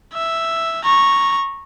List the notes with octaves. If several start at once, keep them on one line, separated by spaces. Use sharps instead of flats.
E5
A#5 C#6